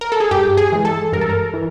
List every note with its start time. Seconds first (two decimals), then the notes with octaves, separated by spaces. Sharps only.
0.01 A#4
0.12 A4
0.20 G#4
0.31 G2 G4
0.57 G#4
0.72 E3 G#3
0.85 A4
1.12 G2 A#4
1.21 A4
1.30 A#4
1.54 E3